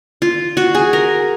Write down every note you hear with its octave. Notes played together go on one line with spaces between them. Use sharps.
F4
F#4
G#4
A#4